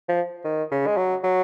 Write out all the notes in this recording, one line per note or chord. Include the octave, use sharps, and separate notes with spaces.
F3
D#3
C#3
G#3
F#3
F#3